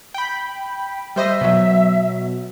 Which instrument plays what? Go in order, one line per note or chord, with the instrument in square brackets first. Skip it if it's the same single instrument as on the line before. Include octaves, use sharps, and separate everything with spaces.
[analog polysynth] G5 B5
[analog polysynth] G3 C5 D#5 [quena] E5
[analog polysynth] B2 F#3